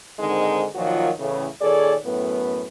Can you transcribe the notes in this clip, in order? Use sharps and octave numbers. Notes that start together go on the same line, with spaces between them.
G#2 D3 D#3 G#3 C4 D#4
A#2 D#3 F3 F#3 F4 F#4
E2 A2 C#3
A#2 D#3 G#4 A4 C#5 D5
F#2 A2 B3